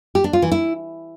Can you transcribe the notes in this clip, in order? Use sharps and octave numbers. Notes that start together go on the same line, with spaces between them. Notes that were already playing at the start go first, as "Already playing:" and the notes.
G4
D4
F4
E3
E4